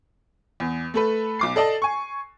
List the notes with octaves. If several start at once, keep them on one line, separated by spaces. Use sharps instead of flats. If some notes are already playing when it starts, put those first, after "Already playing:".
E2
A3 A4 B4
B1 D6 C7
A4 D5 D#5 A5
G#5 C#6